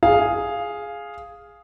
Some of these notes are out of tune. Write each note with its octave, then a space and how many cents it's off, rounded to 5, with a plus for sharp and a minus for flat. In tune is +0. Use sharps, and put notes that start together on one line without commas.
G#4 +0 F5 +0